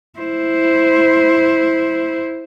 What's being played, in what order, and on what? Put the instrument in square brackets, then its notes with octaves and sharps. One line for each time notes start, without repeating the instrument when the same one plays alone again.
[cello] E4 C5